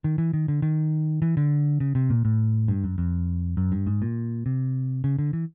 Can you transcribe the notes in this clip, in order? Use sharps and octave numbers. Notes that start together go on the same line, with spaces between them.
D#3
E3
D#3
D3
D#3
E3
D3
C#3
C3
A#2
A2
G2
F#2
F2
F#2
G2
G#2
A#2
C3
C#3
D3
E3